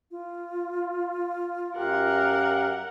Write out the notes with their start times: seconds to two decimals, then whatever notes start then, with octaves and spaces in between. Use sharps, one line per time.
0.11 F4
1.76 F#2 G4 A#4 F5 F#5